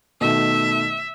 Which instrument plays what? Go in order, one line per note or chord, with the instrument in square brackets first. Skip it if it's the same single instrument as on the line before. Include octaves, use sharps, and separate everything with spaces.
[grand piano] B2 D#3 A3 [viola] E5